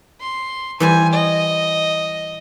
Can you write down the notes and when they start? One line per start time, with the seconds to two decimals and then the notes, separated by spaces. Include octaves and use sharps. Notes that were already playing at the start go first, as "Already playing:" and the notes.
0.20 C6
0.80 E3 G3 C5 G#5
1.13 D#5